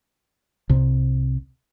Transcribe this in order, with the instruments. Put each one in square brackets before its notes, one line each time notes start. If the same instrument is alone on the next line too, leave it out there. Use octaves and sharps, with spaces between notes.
[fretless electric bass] C2 C3